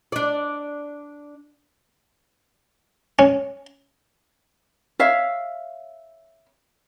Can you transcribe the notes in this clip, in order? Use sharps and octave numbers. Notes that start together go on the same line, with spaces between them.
D4 D5
C#4
C#5 E5 F5